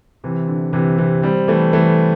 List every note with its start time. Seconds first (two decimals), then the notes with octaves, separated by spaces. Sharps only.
0.24 C3 E3
0.48 D3
0.73 C3 E3
0.98 C3 E3
1.23 G3 C4
1.48 E3 A3
1.73 E3 A3